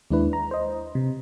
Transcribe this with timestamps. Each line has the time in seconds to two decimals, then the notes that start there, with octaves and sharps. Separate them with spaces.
0.10 D#2 G#3 D4 E4 B4
0.33 A#5
0.51 C5 D#5
0.95 C3